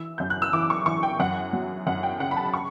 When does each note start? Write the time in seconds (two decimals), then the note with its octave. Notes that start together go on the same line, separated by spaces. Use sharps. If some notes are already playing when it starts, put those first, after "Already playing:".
Already playing: E3 E6
0.18 F#2 G6
0.30 F#6
0.42 E6
0.53 E3 D6
0.70 C#6
0.86 E3 C#6
1.03 G5
1.20 F#2 F#5
1.53 F#3
1.87 F#2 F#5
2.03 G5
2.20 C#3 F#5
2.31 B5
2.36 A5
2.54 C#6